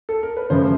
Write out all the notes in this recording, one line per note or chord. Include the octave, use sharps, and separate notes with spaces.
A4
A#4
B4
F#2 C#3 F3 A3 C#4 C5